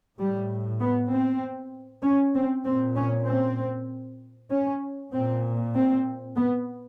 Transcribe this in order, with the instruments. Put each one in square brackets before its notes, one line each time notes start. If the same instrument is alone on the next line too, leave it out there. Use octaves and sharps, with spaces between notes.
[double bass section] A2 G3
B3
C4
C#4
C4
A#2 C4
C#4
C4
C#4
A#2 C4
C4
B3